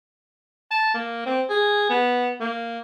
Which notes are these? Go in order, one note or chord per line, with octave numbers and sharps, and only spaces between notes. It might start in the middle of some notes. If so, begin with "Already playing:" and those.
A5
A#3
C4
G#4
B3
A#3